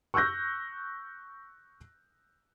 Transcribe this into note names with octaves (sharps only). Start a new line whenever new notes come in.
C#6 E6 F#6 G6 A#6